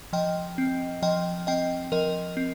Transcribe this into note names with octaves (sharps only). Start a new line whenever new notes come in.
F3 D#5 G5
C4
F3 D#5 G5
C4 D#5 G5
F3 A#4 D#5
C4